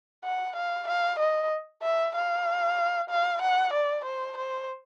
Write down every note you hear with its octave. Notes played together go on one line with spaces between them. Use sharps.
F#5
F5
F5
D#5
E5
F5
F5
F#5
D5
C5
C5